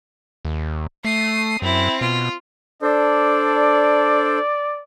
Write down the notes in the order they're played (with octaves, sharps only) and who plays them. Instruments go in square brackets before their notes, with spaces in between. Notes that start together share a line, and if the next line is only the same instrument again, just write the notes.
[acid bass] D#2
[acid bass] A3 [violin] D#6 C7
[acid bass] F#2 [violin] C4 E4
[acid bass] B2 [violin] F4
[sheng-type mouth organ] D4 A4 C5 [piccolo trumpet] D5